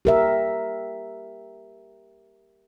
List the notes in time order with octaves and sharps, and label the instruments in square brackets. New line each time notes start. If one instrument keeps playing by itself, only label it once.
[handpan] G4 A#4 E5